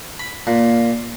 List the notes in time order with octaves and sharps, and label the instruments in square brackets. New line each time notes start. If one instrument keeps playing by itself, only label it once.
[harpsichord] B5
A#2